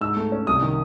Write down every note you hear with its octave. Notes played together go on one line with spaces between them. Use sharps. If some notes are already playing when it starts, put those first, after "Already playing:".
G#2 E6
A3
C#4
C2 D#6
D#3